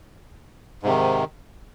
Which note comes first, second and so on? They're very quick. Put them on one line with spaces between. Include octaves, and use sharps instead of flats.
G#2 C3 D#3